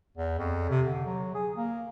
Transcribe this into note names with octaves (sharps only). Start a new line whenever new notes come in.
E2
F2
C3
D3
F#3
G#4
A#3